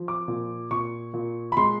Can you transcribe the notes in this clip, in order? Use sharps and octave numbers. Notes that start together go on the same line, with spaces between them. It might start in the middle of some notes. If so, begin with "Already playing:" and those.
Already playing: F3
D6
A#2
A#2 C#6
A#2
B5
G#3 C6